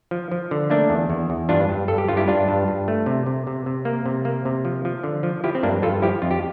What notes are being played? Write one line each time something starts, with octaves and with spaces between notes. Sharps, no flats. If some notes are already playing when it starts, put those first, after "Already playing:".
F3
F3
D3
A3 A#3 D4
E2
E2
E2
G2 D4 F4
G2
G2 A4
G4
G2 F4
E4 G4
G2 D4 F4
G2
G2
A3
C3
C3
C3
C3
A#3
C3
A#3
C3
F3
F3
D3
F3
F3 E4 G4
C4
G2 A#3 D4
G2 F4 A4
F3 E4 G4
F2 F4
G4